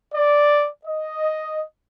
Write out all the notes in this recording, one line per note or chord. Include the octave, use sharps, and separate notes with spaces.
D5
D#5